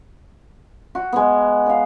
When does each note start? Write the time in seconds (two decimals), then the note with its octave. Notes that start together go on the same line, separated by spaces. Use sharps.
0.95 F#4
1.12 G#3 B3
1.66 D#5 F5